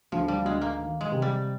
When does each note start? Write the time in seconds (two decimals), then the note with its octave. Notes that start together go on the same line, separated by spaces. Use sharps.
0.12 D2 F3
0.28 G3
0.45 D2 G#3
0.61 A#3
0.78 D#3
1.01 G#3
1.12 C3
1.22 G3